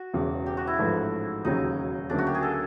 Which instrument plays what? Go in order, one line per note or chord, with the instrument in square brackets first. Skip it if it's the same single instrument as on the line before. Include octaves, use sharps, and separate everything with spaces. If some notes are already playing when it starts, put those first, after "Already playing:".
Already playing: [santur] F#4
[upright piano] E1 E2 C#3
[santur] G4
F#4
E4
[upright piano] A1 G#2 F3 A3
[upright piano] E1 D#2 C#3 F#3 [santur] D#4
[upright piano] D2 C#3 F#3 A#3 C#4 [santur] D4
[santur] F#4
G4
G#4
A4